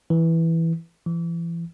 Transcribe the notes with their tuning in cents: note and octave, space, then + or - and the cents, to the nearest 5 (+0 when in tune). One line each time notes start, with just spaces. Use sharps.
E3 -5
E3 +35